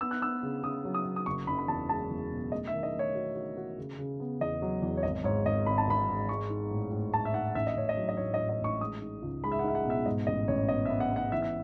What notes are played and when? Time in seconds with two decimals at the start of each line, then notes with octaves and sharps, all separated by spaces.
0.01 B3 E6
0.11 F#6
0.22 B3 E6
0.43 C#3
0.63 C#3 D#6
0.85 F#3
0.94 D#6
1.05 F#3
1.16 D#6
1.26 F#1 C#6
1.47 F#1 B5
1.58 B5
1.68 E2 A5
1.89 G#3 A5
2.10 E2
2.31 B2
2.52 A3 D#5
2.67 E5
2.73 D#3
2.83 D#5
2.93 A3
2.99 C#5
3.15 F#4
3.35 F#4
3.57 F#4
3.78 C#3
3.98 C#3
4.20 B3
4.41 E2 D#5
4.62 F#3
4.82 E2
4.97 C#5
5.03 G#1 D#5
5.24 G#2 C#5
5.45 G#1 D#5
5.66 G#1 B5
5.78 A5
5.87 G#1 B5
6.08 G#2
6.29 G#3 C#6
6.50 D#4
6.71 A2
6.91 A2
7.13 A2 A5
7.25 E5
7.34 D#4 F#5
7.55 A1 E5
7.67 D#5
7.76 A1 C#5
7.89 D#5
7.97 F#3
8.09 D#5
8.17 A2 C#5
8.34 D#5
8.38 A2
8.49 D#5
8.60 A1 C#6
8.81 G#3 D#6
9.02 D#4
9.22 C#2
9.44 G#3 B5
9.52 E5
9.59 F#5
9.64 D#4 E5
9.75 F#5
9.85 B2 E5
10.06 G#2 D#5
10.27 A1 D#5
10.48 A1 C#5
10.69 B3 D#5
10.85 E5
10.90 B3
11.00 F#5
11.12 B3 F#5
11.32 E3 E5
11.42 E5